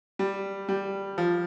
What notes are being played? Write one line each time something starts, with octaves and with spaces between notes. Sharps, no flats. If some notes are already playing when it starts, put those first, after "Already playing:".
G3
G3
F3